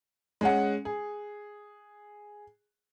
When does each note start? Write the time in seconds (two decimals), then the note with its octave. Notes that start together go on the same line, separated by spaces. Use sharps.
0.41 G#3 C#4 F#5
0.85 G#4